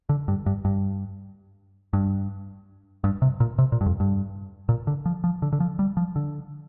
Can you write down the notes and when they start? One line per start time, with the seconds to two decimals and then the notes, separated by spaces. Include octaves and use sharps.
0.09 D3
0.28 G2
0.46 G2
0.65 G2
1.93 G2
3.04 G2
3.22 C3
3.40 A#2
3.58 C3
3.72 A#2
3.81 G2
3.86 F2
4.00 G2
4.69 A#2
4.87 D3
5.06 F3
5.24 F3
5.42 D3
5.53 D3
5.60 F3
5.79 G3
5.97 F3
6.16 D3